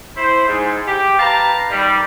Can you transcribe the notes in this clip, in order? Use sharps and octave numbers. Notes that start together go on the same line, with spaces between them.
E4 C5
G#2 G#3
G4 G5
B4 F5 A5 A#5
D#3 G3